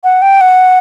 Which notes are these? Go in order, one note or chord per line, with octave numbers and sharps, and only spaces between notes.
F#5
G5
F#5